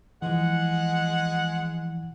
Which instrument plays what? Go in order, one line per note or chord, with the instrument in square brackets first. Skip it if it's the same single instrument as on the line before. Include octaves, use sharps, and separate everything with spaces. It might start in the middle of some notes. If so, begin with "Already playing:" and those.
[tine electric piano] E3 F3 [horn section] G#3 F#5